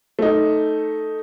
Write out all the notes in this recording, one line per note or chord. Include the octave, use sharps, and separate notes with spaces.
A3 D#4